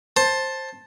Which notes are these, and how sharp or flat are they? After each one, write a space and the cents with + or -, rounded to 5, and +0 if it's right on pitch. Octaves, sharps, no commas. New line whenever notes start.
C5 +15 A5 +0